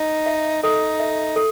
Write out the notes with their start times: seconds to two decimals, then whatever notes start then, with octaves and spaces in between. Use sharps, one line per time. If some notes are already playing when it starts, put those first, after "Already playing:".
Already playing: D#4
0.26 E5
0.63 D#4 A4
1.00 E5
1.36 A4